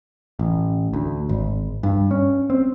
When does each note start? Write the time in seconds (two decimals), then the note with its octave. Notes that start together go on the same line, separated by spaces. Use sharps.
0.39 A1
0.93 D2
1.29 G#1
1.83 G2
2.11 C#4
2.50 C4